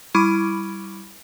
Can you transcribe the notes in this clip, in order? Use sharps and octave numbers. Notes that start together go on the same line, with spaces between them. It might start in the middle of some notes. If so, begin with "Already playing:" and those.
G3 E4 B5 C#6 D6 D#7